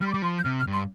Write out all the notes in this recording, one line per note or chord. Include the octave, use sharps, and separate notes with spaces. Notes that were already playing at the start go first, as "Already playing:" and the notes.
G3 F6
C6
G3 D6
F3 C6
G6
C3 F6
F6
G2
C6